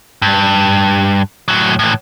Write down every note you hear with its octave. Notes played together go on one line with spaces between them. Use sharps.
G2
A2 F#3
A2 E3